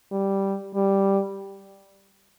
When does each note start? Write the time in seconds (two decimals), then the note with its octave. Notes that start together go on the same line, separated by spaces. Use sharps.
0.12 G3
0.75 G3